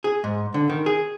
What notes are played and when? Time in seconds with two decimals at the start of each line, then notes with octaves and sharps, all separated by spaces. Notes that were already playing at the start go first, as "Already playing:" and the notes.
0.04 G#4
0.24 G#2
0.54 D3
0.70 D#3
0.86 G#4